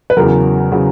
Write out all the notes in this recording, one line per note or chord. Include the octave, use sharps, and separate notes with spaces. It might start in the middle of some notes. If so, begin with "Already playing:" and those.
B4
E2 C#3 F#3 A#4
C#3 F#3